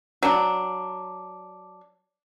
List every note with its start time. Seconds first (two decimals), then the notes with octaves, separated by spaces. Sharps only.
0.23 F#3 D4